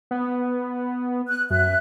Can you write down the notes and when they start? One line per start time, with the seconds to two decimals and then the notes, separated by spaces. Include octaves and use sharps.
0.11 B3
1.28 F#6
1.50 F#2 E5 F#6